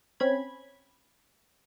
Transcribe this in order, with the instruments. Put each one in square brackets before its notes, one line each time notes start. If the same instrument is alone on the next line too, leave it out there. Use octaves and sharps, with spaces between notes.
[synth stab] C4 C#4 B5 G#6